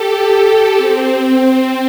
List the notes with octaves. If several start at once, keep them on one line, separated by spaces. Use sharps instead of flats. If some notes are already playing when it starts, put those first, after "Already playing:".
Already playing: G4 A4
G4
C4